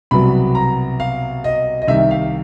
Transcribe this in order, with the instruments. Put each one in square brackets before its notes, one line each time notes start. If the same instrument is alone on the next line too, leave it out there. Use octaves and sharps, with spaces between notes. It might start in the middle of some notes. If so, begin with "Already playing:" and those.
[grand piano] C2 B2 F#3 B3 B5
A#5
F5
D#5
D#5
C2 C3 D#3 E5
F5